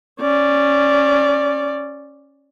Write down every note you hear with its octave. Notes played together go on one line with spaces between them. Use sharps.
C#4 D5